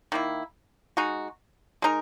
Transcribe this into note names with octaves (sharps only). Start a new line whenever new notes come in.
D#3 A#3 E4
G#3 D#4 F#4
G#3 D#4 A#4